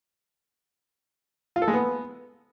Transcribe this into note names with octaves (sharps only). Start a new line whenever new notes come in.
F4
A4
G#3
B3